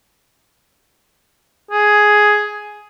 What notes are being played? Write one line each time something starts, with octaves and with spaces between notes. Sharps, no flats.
G#4